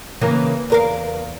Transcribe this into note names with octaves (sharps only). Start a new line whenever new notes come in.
C#3 E3 A#3
E2 A#4 F5